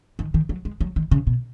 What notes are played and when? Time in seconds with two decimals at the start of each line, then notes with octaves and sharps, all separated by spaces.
0.19 D#3
0.34 D#3
0.49 F#3
0.65 G#3
0.81 F#3
0.96 D#3
1.11 C#3
1.27 B2